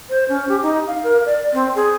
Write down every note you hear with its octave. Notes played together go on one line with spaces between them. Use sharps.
C5
C#4
G4
D#4
F5
A#4
D5
C4
G#4